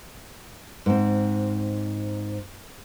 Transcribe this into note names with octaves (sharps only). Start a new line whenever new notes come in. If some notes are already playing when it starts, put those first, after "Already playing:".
G#2 C4